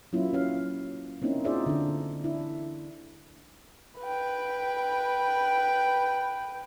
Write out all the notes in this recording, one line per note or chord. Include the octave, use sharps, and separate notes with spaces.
F#3 A#3 C#4 E4 F4
C#4 B4 F5
A#3 C4 C#4 D#4 E4
D#4 F4 G#4 C5 D5 E5
D3 D4
D4 E4
B4 G5